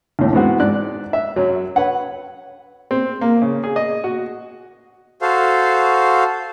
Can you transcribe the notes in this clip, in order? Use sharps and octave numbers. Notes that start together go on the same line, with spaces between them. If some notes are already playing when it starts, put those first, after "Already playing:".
D#2 A2
G#2 E3 B3 C4 F#4
G#2 D5 F#6
E5
F#2 F#3
B4 C#5 F#5
C4
A#3
C#3
G#4
D#5
F#4
F#4 A4 C5 F5